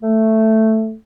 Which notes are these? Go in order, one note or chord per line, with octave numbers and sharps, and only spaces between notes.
A3